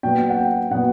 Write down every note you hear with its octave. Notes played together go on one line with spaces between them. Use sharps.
A#2 F#3 B3 G5
F#5
G5
A#2 F#3 B3 F#5